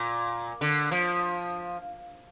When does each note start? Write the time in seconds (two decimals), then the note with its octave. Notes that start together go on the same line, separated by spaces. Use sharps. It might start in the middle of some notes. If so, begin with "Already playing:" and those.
Already playing: A#2
0.61 D3
0.91 F3